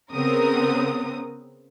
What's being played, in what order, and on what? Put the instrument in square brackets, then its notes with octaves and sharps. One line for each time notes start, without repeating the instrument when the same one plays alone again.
[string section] C#3 B3 C4 A#4 D#6